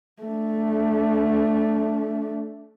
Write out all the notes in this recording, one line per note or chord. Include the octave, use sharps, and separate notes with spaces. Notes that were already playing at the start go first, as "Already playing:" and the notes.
A3 D4